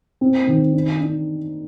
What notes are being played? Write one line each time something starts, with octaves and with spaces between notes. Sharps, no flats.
C4
D#3
D4
D4